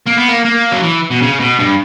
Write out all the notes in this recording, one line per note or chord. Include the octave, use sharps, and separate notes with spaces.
A#3
B3
A#3
A#3
F#3
E3
B2
C#3
B2
G2